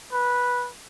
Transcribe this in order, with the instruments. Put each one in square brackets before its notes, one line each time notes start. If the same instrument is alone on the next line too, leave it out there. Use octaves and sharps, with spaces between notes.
[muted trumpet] B4